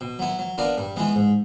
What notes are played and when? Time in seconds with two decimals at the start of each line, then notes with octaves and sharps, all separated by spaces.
0.01 B2
0.19 F#3 B3 E4
0.39 F#3
0.58 B3 D4 F4 A#4
0.78 G2
0.96 E3 G#3 B3
1.15 G#2